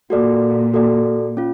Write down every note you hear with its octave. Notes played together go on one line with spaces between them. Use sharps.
A#2 F#4 A4 D5
F#4 A4 D5
C#4 F4